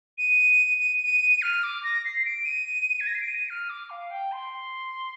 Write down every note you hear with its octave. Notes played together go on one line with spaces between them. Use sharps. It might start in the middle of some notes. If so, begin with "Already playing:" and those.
D#7
D#7
D#7
F6
D6
A#6
C7
C7
D7
D#7
G#6
A#6
C7
D7
D#7
F6
D6
F5
G5
C6